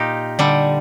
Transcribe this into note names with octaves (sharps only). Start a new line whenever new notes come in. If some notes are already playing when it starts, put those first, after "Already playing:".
Already playing: A#2 D#4 F4 G4
D3 G3